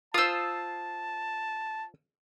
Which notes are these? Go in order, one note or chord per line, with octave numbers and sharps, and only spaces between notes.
F4 C5 A5 D#6 E6